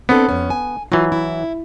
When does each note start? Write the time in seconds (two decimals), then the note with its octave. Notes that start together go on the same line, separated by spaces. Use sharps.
0.09 B3 C4 D4 A4
0.29 F2 C#4
0.50 G#5
0.92 E3 F#3 F4
1.12 E4